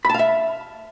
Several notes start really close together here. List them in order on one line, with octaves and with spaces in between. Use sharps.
B5 A5 F5 E5